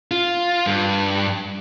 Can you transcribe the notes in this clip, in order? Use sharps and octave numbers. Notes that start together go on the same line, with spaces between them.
F4
G2